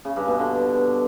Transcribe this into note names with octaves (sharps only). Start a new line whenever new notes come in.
C#3
G2
B2
D3